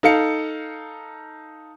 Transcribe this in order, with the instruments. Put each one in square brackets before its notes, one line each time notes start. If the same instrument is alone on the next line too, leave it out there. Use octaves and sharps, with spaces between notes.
[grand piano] D#4 A4 F5 C#7